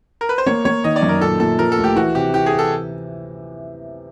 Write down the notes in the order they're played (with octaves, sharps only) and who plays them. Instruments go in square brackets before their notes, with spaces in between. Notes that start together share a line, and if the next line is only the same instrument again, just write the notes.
[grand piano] A#4
B4
C5
[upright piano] A#3 [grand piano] C#5
[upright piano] A#3 [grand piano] C#5
[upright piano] D#3 [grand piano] D#5
[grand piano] D5
[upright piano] F#2
[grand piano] A#4
[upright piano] A#2 [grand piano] A4
[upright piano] A#2 [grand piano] A4
[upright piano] F3 [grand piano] A#4
[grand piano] A4
[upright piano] D2
[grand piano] G4
[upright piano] E3 [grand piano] F#4
[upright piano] C3 [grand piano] G4
[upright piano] E3 [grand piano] G4
[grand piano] G#4
[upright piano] E3
[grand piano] A4